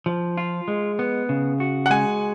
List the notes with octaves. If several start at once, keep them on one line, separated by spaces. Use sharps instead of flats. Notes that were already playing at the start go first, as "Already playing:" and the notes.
F3
F4
G#3
B3
C#3
F#4
F#5
G#3 G#5